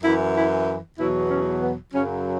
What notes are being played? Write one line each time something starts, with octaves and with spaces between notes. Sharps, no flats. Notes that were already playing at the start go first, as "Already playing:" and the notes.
F#2 E3 E4
E4
E2 B2 F#3 E4
C#4
B3
F#2 C#3 F#3 C#4